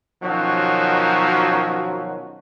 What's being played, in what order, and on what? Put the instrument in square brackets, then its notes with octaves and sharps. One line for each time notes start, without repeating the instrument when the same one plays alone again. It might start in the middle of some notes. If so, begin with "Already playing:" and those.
[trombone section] B2 D#3 F3 F#3 C#4 F#4